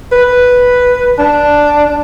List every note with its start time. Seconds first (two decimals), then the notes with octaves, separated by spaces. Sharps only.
0.12 B4
1.19 D4